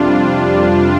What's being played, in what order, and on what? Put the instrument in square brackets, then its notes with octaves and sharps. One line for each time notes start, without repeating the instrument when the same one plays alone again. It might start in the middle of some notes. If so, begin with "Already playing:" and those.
Already playing: [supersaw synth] F2 C3 G3 D4 F4